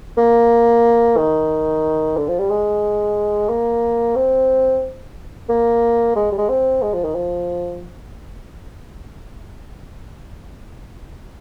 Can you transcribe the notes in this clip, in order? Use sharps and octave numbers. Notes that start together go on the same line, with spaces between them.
A#3
D#3
D3
F3
G3
G#3
A#3
C4
A#3
G#3
G3
G#3
C4
G#3
F3
D#3
F3